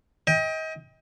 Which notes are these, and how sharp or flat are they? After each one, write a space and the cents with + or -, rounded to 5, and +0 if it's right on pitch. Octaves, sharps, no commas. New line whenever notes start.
D#5 +35 G5 +20